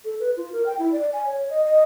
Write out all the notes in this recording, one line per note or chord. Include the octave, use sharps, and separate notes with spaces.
A4
B4
F4
A#4
G5
E4
D5
G#5
C#5
D#5
D#5